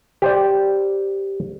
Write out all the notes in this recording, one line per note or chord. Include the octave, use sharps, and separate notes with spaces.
G4 C5 D5